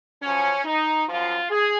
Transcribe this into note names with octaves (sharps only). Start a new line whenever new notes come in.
F#2 F3 C#4
D#4
F#2 F3 F4
G#4